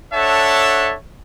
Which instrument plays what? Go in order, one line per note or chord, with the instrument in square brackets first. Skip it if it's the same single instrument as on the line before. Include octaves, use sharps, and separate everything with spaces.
[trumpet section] D4 A4 C#5 E5 F#5 A5